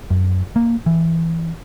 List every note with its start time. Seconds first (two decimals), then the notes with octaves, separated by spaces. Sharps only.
0.10 F#2
0.56 A#3
0.86 E3